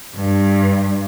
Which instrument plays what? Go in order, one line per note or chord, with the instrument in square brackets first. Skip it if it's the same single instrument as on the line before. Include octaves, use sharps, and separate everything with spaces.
[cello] G2